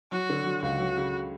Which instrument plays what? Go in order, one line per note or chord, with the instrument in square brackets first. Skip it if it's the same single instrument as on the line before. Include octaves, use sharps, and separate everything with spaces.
[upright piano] F#3 [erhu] F#4
[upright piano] D3
F#3
[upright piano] C#2 [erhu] F#4
[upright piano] F#3
C#3